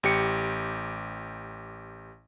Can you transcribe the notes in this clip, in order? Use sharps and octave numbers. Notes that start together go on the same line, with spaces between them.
A1 G4 C#7